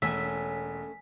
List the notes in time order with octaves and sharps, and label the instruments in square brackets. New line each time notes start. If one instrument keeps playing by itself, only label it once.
[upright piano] E1 [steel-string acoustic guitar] A3 C#4 [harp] G#5 E6 [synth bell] B6